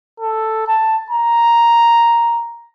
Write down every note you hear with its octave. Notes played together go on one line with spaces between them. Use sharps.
A4
A5
A#5